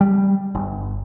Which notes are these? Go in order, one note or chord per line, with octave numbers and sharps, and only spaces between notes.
G3
G1